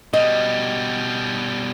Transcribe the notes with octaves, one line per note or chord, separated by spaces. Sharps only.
B2 G3 D#5